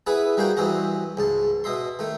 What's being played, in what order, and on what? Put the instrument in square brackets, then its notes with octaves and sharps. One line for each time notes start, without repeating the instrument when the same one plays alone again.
[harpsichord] B3 E4 G#4 B4 E5 G#5
G3 A#3 F#4 G#4 G5
G2 E3 C4 F#4 D#5
C#2 G#2 A5
B2 D#5 E5 C6
D#3 A3